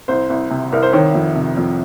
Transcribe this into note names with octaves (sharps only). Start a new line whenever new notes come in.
C2 C5
C2
C3
C2 A#4
C5
D#3 C#5
F2
C3
F2